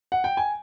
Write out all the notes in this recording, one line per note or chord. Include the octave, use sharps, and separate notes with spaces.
F#5
G5
G#5